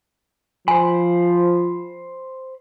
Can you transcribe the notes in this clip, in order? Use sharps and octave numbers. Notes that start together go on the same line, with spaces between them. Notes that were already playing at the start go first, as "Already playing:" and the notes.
F3 C5 G#5 B5